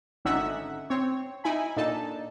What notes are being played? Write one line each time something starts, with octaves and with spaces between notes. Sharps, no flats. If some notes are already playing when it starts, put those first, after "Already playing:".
G#1 D3 C#4 D#4 E5 F#5
C4 C#5
D#4 E4 G#5 B5
A#2 D4 D#4 A4 A5